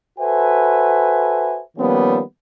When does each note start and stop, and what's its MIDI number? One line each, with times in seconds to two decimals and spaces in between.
0.18 1.61 66
0.18 1.61 69
0.18 1.61 71
0.18 1.61 72
0.18 1.61 76
0.18 1.61 80
1.77 2.21 51
1.77 2.21 53
1.77 2.21 55
1.77 2.21 58
1.77 2.21 59
1.77 2.21 61